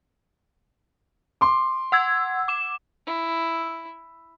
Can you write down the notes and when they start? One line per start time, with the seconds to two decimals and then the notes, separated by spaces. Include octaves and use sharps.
1.41 C6 D6
1.92 F#5 E6 G#6
2.48 D6 E7
3.06 E4